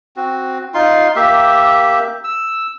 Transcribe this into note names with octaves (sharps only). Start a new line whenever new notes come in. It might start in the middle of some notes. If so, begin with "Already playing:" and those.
C4 F#4
D#4 F4 C6
A#3 G4 E5
E6